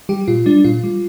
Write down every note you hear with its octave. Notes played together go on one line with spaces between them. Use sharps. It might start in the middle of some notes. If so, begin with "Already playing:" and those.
G3 G4
A#2 F4
G3 D4
A#2 F4
G3